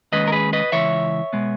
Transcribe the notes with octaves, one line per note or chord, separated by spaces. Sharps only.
D#2 D#3 G#3 C#4 B4 D#5
A#4
G#4 B4
B4 D#5
C#2 C#3 E3 C#5 E5
B2 G#3 B3